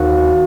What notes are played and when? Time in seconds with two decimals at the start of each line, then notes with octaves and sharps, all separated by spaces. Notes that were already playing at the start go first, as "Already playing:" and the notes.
Already playing: D#2 D#3 C4 F#4